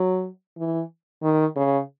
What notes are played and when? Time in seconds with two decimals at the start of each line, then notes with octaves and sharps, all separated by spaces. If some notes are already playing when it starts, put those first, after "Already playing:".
Already playing: F#3
0.58 E3
1.23 D#3
1.56 C#3